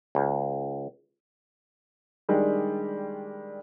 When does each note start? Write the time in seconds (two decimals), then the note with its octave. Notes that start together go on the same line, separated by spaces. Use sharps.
0.15 C#2
2.29 D#3 G3 G#3 D4